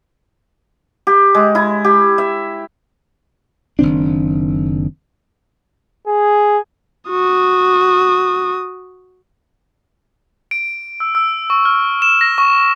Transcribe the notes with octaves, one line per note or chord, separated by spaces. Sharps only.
G4
G#3
E4
G4
E5
F#1 D#3 C4 D4
G#4
F#4 D#6
D7
E6
E6
C#6
F6
E7
A#6
C#6